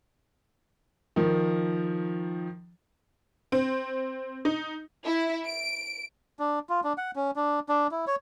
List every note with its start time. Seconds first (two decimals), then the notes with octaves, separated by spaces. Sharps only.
1.16 D#3 F3
3.52 C4
4.45 D#4
5.05 E4
5.45 D7
6.39 D4
6.69 F4
6.84 D4
6.98 F#5
7.16 C#4
7.36 D4
7.69 D4
7.91 E4
8.07 C#5